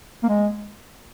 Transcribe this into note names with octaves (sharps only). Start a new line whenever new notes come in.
A#3
G#3